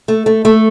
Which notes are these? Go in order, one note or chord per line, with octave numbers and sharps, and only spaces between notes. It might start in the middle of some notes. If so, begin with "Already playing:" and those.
A3
A3
A3